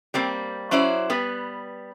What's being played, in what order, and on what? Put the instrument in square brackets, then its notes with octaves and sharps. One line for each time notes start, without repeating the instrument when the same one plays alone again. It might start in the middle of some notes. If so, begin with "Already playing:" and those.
[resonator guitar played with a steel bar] G3 A#3 C4
F#3 C#4 E4 C5 D5
G3 B3 B4